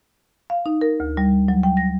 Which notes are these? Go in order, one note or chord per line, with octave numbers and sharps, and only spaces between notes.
F5
D#4
A#4
D2
G3
F#3
G5
A#6